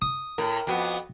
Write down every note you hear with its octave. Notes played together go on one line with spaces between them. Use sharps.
D#6
A2 A#4
F2 B3 F#4 G5